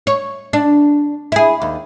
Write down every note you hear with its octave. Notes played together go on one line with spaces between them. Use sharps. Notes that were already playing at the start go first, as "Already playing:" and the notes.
C#5
D4
E4 G#4
D#2